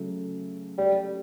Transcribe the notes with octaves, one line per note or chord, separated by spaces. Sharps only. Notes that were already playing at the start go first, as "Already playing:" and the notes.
Already playing: C#3 F#3 A3
F#3 G3 A3 C#4 G4